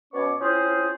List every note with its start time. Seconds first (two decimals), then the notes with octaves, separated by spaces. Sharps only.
0.14 B2 B3 C#4 C#5 D5 C#6
0.40 C4 C#4 E4 F4 G#4 C5